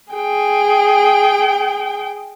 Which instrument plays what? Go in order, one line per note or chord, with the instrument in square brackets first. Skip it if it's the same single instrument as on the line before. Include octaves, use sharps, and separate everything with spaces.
[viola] G#4 G5